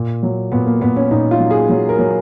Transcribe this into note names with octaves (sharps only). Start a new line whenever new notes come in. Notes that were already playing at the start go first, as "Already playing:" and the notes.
Already playing: A#2
F#3
A#2 B3
A#3
A#2 B3
C#4
A#2 D#4
F4
F#3
G#4
F#3
A#4
F#3